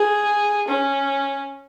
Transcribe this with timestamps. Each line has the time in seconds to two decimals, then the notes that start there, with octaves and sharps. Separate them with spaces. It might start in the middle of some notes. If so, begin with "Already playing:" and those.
Already playing: G#4
0.68 C#4